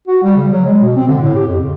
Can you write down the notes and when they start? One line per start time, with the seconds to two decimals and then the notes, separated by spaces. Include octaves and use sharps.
0.07 F#4
0.23 G3
0.36 C#3
0.53 F#3
0.65 G#3
0.81 B2
0.96 C4
1.08 D3
1.21 A2
1.35 G4
1.48 F2
1.60 C#3